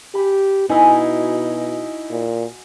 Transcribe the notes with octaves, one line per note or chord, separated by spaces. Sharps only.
G4 B5
B2 D#4 E4 F#4 D#5 G#5
A#2